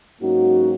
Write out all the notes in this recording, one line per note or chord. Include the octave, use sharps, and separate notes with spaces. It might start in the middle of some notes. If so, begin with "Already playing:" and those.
G#2 F#3 A#3 C#4 D#4 F#4